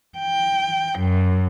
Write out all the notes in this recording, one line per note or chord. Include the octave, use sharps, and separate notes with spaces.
G5
F#2